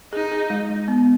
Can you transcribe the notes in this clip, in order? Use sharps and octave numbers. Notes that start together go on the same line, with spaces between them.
D#4 G#4
G#4
G#3
G#3
B3